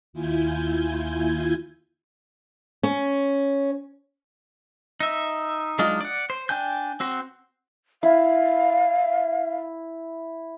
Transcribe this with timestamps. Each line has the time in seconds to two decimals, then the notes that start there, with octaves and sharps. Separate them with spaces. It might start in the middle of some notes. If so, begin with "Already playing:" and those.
0.13 D#2 E4 F4 G#5 G6 G#6
2.83 C#4
5.00 D#4 E5
5.79 F#3 G#3 D4 D#4 F4
6.01 D5 F#5
6.30 C5
6.49 D4 G5 G#5 G6
7.00 C4 F#4 C5
8.03 E4 F5